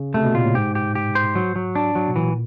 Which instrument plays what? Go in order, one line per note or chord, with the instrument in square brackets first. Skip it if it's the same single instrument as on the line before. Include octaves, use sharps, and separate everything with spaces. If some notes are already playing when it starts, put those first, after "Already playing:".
Already playing: [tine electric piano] C#3
[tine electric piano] C3 [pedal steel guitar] A3
[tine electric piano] B2
[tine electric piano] A#2 [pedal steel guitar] F4
[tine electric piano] A2
[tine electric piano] G#2 [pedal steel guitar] G4
[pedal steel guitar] G4
G4
C5
F#3
F#3
D4
F#3
[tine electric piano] B2
[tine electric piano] A#2 [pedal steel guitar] E3